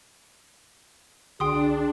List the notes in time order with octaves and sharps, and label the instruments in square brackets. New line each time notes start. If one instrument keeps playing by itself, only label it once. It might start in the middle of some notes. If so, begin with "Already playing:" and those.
[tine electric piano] C2 D3 F#4 [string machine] D4 [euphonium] G#4 [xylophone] G5 C6 D#6